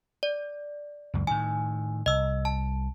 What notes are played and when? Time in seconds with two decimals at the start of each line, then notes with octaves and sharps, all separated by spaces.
0.23 D5
1.14 C#2 F#2
1.27 A2 D#3 G#5
2.06 C2 D#5 E6
2.45 A5